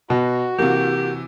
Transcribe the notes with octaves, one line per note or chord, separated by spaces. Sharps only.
B2 F#4
C3 E3 A#3 G4